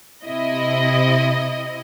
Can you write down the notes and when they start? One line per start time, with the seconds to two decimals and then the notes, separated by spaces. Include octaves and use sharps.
0.25 C3 E4 D#5